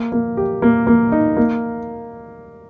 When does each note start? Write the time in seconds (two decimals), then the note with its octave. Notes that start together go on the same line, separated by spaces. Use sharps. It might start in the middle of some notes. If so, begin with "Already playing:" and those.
Already playing: A#3
0.12 A#3
0.37 G4
0.62 A#3
0.87 A#3
1.12 D#4
1.37 A#3